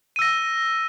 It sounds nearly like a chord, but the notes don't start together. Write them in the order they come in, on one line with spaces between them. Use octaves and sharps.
D#7 E6 A#6